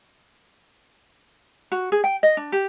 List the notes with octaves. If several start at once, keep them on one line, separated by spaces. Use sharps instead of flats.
F#4
G#4
G5
D#5
D4
G4